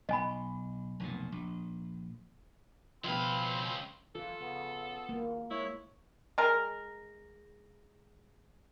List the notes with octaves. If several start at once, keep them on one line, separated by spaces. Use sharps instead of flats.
B1 D#5 G#5 B5
F1 B1 A#2
A#1
C#2 B2 F3 C4 B4 E5 F5
E3 F4 A4
C#3 B3
G#1 A#3
G#3 E4 C#5
G#3 A#4